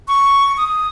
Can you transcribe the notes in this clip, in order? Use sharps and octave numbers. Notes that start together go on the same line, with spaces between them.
C#6
D#6